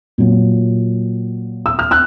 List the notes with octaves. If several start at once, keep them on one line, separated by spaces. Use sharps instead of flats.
A#2 F#3
E6
F6
E6 F#6